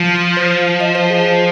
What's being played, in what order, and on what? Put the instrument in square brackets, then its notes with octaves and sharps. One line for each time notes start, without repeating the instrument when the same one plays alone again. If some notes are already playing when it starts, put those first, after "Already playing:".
Already playing: [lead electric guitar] F3
[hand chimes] C5
D#5
C5
G#4
C5